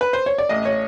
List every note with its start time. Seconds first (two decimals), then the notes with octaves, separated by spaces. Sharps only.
0.01 B4
0.13 C5
0.26 C#5
0.38 D5
0.49 A1 D#5
0.65 C#5